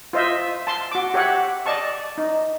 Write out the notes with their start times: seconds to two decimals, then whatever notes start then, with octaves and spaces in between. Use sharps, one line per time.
0.13 F4 C5 D#5 E5
0.67 A5 C6
0.91 F#4 D6
1.14 G4 C#5 E5 F#5
1.66 D5 D#5 A5 C#6
2.18 D#4